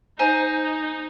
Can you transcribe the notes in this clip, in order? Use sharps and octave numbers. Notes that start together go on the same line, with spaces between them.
D#4 C5 G#5 A#5